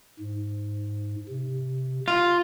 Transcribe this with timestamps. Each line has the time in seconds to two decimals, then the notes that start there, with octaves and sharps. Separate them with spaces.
0.19 G#2
1.29 C3
2.08 F4